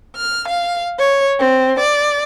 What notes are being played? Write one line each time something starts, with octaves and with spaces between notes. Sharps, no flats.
F6
F5
C#5
C4
D5